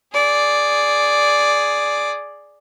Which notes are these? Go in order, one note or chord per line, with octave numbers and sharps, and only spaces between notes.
G#4 D5